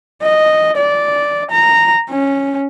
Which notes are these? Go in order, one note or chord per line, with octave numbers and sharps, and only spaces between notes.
D#5
D5
A#5
C#4